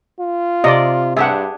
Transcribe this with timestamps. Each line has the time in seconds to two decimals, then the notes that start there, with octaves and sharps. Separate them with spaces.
0.20 F4
0.64 C3 D5 D#5
1.17 G2 D4 G4 G#4 E5 F#5